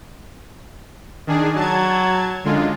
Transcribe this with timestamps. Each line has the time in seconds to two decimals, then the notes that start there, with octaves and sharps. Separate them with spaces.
1.27 D#3 D4 G#4
1.56 F#3 A5 G#6
2.44 F#2 D3 G#3 F4